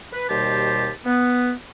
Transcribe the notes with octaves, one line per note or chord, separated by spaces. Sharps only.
B4
D#2 B2 G3 G4 C5 A5
B3